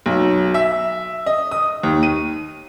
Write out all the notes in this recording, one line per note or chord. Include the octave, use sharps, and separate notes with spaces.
B1
E5
D#5
D#6
D#2
D#7